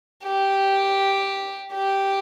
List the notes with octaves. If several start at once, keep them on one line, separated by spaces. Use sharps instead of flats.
G4
G4